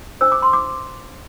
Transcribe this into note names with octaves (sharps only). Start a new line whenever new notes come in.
D4 C5 E6
D6
C6
D6